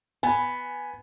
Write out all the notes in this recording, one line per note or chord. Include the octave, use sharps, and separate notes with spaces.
B3 G#5